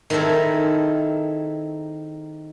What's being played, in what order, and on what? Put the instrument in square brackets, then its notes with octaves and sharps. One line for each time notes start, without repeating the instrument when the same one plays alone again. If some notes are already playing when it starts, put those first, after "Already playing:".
[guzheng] D#3 C4 E4 G#4 A4